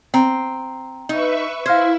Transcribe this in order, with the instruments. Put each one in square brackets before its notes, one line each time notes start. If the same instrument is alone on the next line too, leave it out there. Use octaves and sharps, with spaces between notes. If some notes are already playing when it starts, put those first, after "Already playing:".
[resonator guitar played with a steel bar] C4 [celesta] G5 A#5
[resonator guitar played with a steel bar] D#4 [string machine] B4 E5 C#6
[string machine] E4 E5 [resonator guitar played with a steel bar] C5 [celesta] F5 F6 G#6